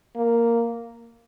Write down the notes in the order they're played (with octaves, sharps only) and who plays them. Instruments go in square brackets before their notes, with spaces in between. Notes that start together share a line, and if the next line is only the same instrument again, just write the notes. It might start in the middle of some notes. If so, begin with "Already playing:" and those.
[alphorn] A#3